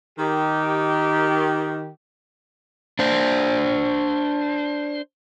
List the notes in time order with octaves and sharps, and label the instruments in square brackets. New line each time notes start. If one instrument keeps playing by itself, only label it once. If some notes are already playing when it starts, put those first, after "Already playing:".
[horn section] D#3 G4
[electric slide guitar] D4 C5